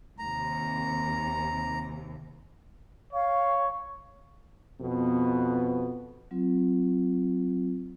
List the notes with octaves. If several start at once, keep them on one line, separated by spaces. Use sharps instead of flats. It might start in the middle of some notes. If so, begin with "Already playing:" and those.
D#2 C3 A#5
C#5 F5
F2 B2 B3
F#3 C4 F4